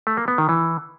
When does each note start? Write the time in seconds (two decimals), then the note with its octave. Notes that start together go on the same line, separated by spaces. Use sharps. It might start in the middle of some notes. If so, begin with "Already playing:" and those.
0.07 A3
0.17 A#3
0.28 B3
0.38 D#3
0.49 E3